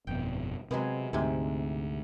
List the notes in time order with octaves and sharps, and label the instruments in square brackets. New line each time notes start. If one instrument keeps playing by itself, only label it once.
[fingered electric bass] G1 F2 B2 [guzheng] G5
[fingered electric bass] C3 [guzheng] F#3 G#3 B3
[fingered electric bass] D2 [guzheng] G#2 C3